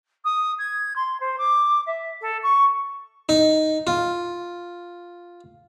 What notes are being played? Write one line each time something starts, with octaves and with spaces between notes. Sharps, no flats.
D#6
G#6
C6
C5
D6
E5
A4
C#6
D#4
F4